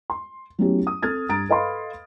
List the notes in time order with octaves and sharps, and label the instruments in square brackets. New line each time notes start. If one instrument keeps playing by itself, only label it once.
[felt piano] C6
F#3 A3 B3 C#4 E4 G4
D#6
C4 A4 F6 G#6 A6
G2 A#5 A6 D7
A4 B4 D#5 F5 B5 C6